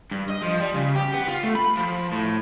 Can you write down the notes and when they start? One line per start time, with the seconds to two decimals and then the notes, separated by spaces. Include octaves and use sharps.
0.11 G2
0.30 D#5
0.43 F3
0.61 G3
0.75 C#3
0.96 G4
1.14 B3
1.28 F4
1.43 A3
1.55 B5
1.77 F3
2.12 A2